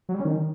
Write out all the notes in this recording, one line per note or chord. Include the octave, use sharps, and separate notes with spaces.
F#3
G3
C#4
D#3